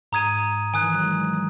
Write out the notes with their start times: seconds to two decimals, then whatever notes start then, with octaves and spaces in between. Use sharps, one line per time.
0.12 G#2 A#5 D#6 G#6 D#7
0.74 D#3 G#5 D#6 F#6
0.83 E3
0.94 F#3
1.04 G#3